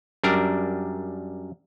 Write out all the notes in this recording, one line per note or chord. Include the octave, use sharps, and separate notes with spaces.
F#2 G3 D4 A#4